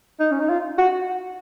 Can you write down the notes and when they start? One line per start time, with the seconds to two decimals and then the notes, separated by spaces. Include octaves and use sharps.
0.19 D#4
0.31 C#4
0.39 D#4
0.49 F4
0.78 F#4